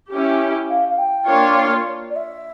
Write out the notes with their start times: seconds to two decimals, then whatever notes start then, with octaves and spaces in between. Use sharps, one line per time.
0.10 C#4 E4 G4
0.69 F5
0.88 F5
0.98 G5
1.28 A#3 D4 F4 C#5
2.10 D5
2.16 E5